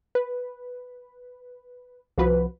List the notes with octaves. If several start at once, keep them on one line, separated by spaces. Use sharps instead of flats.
B4
C2 F3 F#4 B4